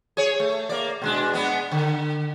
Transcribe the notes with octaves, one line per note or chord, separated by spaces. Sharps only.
G#4 C#5
A3
A#3 D5
B2 G#3 D4
G#3 B3 D4
D3